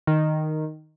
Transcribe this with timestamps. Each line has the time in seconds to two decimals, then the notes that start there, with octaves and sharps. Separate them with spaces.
0.07 D#3